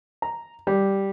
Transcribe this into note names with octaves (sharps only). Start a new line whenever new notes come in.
A#5
G3